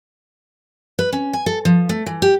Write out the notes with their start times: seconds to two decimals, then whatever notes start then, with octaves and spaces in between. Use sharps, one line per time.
0.99 B4
1.13 C#4
1.33 G#5
1.46 A4
1.65 F3
1.89 A3
2.06 E3
2.22 G4